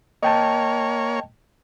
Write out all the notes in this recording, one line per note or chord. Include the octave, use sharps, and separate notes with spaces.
A#3 C#5 D#5 G5 A5